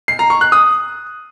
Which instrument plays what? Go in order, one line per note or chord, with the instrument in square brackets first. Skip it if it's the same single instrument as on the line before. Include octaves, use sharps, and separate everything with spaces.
[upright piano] C7
A#5
C#6
F#6
D#6